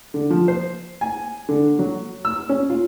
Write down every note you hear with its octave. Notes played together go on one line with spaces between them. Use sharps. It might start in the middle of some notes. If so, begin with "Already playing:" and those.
D3
F3
C5
G#5
D3
F#3
E6
C#4
F4